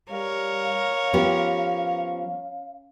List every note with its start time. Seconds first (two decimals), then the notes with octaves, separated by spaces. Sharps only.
0.11 G3 A#4 C#5 F5
1.13 F3 B3 C#4 G4